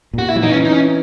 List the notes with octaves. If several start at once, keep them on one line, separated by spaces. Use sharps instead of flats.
A#2 F#4
E4
F#3
E3 D#4
C#4
D#4
C#4